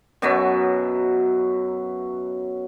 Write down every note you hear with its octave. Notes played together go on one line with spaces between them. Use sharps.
F#2 B2 F#3 E5